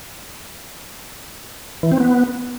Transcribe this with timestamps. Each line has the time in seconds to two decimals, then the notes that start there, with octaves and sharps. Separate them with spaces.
1.83 E3
1.92 C4
2.00 B3